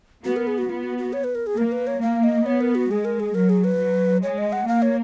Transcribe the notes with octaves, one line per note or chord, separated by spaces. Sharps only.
B3 F#4
A#4
G#4
F#4
B3 F4
F#4
F#4
C#5
B4
A#4
G#4
A#3 A#4
B4
C#5
A#3 F5
D#5
B3 C#5
A#4
F#4
G#3 G#4
A#4
G#4
F#3 A#4
G#4
B4
F#3
G#3 C#5
D#5
F#5
A#3 F5
C#5